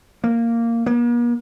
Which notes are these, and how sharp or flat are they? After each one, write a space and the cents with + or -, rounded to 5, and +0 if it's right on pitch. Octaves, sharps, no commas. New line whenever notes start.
A#3 -10
A#3 +45